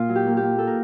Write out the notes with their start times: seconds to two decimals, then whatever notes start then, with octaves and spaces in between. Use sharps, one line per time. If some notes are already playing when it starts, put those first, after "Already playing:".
Already playing: A#2 F4
0.09 F#3
0.16 G4
0.27 A#3
0.37 G4
0.43 A#3
0.58 A#3 A4
0.67 A#4